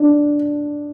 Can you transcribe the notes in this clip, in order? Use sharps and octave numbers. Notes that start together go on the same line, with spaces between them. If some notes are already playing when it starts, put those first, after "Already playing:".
Already playing: D4